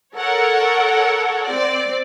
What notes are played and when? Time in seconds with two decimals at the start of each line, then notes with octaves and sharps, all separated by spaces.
0.17 A4 A#4 C#5 F#5
1.48 C4 D5